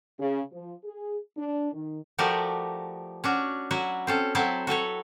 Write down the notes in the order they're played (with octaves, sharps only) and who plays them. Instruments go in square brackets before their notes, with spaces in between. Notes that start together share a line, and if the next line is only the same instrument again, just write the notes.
[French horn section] C#3
F3
G#4
D4
D#3
[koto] F3 A3 F#4 G4 A#4 D5
C#4 D4 F#4
F#3 E4 F#4
C4 C#4 A4
F#3 C4 E4 A4 E5 A5
F#4 A4 B4 C#5